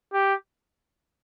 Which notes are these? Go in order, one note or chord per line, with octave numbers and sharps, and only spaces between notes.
G4